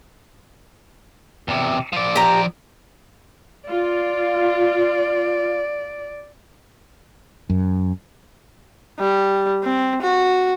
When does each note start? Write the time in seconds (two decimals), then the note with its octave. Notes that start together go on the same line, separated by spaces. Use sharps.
1.48 E2 C3
1.93 F3 D5
2.16 G4 A#5
3.69 F4 D5
7.50 F#2
8.99 G3
9.63 C4
10.02 F#4